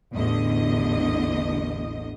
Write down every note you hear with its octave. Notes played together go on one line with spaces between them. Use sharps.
A1 E2 D3 D#5